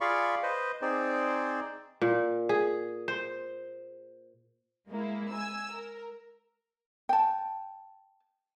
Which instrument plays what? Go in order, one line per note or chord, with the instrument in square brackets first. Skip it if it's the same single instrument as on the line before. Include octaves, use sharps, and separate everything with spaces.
[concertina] F4 G#4 D5 F5 B5 C#6
B4 C5 D#5
C4 D#4 G#4 C5 D5
[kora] A#2
G#4
C5
[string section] G#3 A#3 E4
G#5 E6
A#4
[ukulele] G5 A5